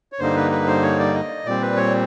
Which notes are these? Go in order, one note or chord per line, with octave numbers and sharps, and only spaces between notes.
C#5
G2 D3 G3 A#3 D#4 C5
B4
B4
C5
C#5
D5
D#5
A#2 G3 C4 D5
B4
C#5